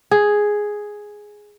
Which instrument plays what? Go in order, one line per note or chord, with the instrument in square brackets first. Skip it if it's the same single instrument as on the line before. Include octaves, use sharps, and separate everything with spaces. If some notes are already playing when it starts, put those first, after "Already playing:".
[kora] G#4